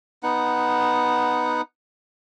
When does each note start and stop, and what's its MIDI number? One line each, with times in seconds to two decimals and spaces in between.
0.23 1.61 59
0.23 1.61 63
0.23 1.61 78